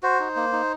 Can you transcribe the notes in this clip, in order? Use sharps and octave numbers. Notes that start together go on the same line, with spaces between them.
F#4 C5
D#4
A#3
D#4